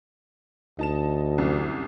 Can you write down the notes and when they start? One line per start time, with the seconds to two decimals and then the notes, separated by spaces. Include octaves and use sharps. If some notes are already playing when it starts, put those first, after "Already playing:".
0.79 D2 D#4 A5 E7
1.38 C2 F#2